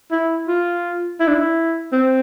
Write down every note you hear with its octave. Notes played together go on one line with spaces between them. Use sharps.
E4
F4
E4
D4
E4
C4